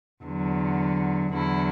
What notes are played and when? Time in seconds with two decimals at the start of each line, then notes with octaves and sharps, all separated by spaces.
0.22 E2 D3 F#3
1.31 E2 D3 F#3 E4